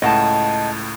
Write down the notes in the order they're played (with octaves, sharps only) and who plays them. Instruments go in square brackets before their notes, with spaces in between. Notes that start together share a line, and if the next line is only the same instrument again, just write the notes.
[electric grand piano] C#2 A2 [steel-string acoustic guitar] D#5 F#5 A5